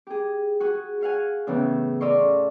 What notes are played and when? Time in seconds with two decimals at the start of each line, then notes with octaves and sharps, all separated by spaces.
0.07 G4 G#4
0.60 F#4 G#4
1.01 F#4 F5 F#5 G#5
1.47 A2 C#3 E3 B3
2.01 A4 D5 D#5 F5 C6 C#6